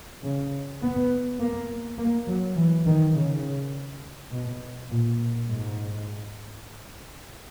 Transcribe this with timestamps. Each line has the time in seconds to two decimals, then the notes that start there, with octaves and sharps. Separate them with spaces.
0.23 C#3
0.82 B3
1.40 A#3
1.98 A#3
2.27 F#3
2.56 E3
2.86 D#3
3.15 C#3
4.32 B2
4.90 A#2
5.48 G#2